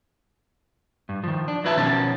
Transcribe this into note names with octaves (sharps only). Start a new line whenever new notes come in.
G2
D#3 F3
D4
F#3 F4 B4 E5 G5 A5
B2 D#3 F3 C#4 A5